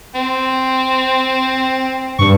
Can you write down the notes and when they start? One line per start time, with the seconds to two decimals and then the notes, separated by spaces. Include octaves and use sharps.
0.15 C4
2.19 G2 C#6